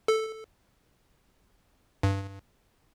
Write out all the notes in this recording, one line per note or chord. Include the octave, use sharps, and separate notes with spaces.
A4
G2